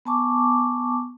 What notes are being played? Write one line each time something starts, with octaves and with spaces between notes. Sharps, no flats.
B3 G#5 A5 C#6 D6